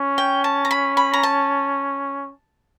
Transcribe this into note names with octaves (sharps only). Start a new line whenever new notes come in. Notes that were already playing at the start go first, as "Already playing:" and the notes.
Already playing: C#4
G5
A5
A#5
B5
B5
A#5
A5